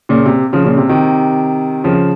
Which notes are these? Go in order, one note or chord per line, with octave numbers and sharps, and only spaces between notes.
A#2 C#3
C3
C#3 F3
A#2 C#3
C3
C3 D#3
C#3 F3